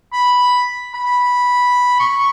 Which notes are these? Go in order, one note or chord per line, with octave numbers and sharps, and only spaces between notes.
B5
B5
C#6